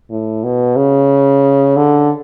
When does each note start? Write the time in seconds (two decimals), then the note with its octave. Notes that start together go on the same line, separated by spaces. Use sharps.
0.10 A2
0.44 B2
0.76 C#3
1.76 D3